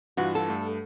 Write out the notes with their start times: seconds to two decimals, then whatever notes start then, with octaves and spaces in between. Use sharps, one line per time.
0.17 G2 E3 F4 F#4
0.35 A4
0.48 G2 A3